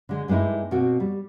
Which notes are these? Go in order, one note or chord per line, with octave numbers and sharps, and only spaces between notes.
D3 G#3
G2 G#3 A#3 D#4 E4
B2 A#3 C4 F#4
G3